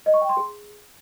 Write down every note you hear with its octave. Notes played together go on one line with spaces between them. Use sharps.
D#5
C#6
G5
C6
G#4